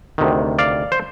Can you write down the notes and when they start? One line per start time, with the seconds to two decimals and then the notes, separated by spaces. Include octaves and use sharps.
0.18 D2 C3 D#3
0.59 D5 F5
0.92 C5